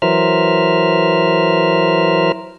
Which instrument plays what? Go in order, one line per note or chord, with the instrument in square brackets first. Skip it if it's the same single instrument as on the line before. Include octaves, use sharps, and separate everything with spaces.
[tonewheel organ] E3 F#3 A#4 C5 E5 F6